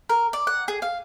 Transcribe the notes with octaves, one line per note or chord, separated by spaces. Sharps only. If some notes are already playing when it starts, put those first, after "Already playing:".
A#4
D5
F#5
G#4
F5